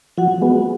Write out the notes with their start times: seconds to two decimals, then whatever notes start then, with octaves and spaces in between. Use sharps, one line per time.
0.18 F3 F#4 F#5
0.42 G#3 B3